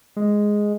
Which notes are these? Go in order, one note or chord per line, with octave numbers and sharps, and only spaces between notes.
G#3